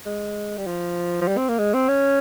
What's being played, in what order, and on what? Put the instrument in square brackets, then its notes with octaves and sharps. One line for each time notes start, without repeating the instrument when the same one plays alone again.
[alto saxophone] G#3
G3
F3
F3
G3
C4
A#3
G#3
C4
C#4